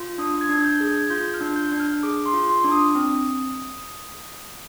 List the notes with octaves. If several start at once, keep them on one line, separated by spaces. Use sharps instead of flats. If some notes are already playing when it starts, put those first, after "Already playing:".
Already playing: F4
D4 D#6
G#6
D4
G6
G#4
G#6
F4 G6
F6
D4
G6
D4
F6
G#4 D6
C6
F4
C6
D4 D6
D#6
C4